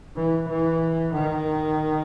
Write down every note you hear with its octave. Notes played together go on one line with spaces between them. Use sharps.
E3
E3
D#3